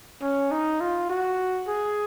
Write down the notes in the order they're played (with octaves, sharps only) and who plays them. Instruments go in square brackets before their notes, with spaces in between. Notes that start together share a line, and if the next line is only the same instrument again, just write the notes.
[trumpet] C#4
D#4
F4
F#4
G#4